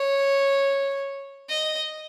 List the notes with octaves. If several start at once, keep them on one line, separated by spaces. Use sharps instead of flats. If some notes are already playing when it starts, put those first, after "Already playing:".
Already playing: C#5
D#5